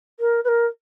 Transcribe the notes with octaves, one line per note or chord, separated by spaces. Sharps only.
A#4
B4
A#4